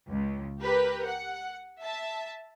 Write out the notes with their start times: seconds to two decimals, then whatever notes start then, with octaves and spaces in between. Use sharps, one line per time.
0.10 C#2
0.62 G4 A#4 B4
1.05 F#5
1.82 E5 A5